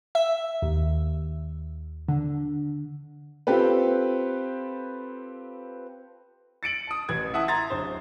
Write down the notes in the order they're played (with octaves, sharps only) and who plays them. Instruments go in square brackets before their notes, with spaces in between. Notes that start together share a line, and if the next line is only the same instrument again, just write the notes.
[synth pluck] E5
D#2
D3
[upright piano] C4 F4 G4 A4 B4
[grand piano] A6 C#7 D7 F#7
A5 D#6
A1 B4 G#6
E4 E5 F#5 A5 D#6
A#5 C6 G#6 A6
D1 C5